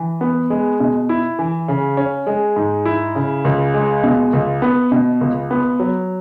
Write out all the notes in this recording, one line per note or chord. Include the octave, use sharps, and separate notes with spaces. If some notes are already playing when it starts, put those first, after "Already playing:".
Already playing: E3
B3
G#3
B2
E4
E3
C#3
C#4
G#3
G#2
E4
C#3
C#2
G#3
B2
C#2
B3
B2
C#2
B3
F#3